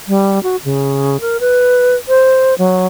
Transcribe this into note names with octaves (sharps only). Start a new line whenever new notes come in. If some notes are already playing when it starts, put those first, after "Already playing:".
G3
F#4
C#3
A#4
B4
C5
F#3